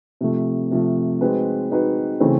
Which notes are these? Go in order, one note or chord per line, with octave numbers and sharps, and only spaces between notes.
C3 F3 A3
C3 F3 A3
G#3 C4 D#4 F#4 B4
G#3 C4 D#4 F#4 B4
C#3 E3 A3 C4